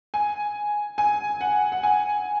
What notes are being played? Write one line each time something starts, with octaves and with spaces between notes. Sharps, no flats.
G#5
G#5
F#5
F#5
G#5